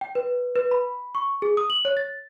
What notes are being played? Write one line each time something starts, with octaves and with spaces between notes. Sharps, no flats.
G5
B4
B4
B5
C#6
G#4
D#6
F#7
C#5
A6